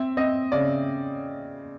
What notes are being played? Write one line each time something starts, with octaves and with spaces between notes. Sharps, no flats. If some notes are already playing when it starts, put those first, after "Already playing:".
Already playing: C4 E5
C4 D#5
C#3 D5